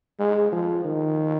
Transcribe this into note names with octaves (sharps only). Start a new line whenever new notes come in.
G#3
F3
D#3